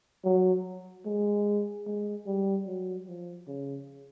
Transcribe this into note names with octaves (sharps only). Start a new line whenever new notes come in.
F#3
G#3
G#3
G3
F#3
F3
C#3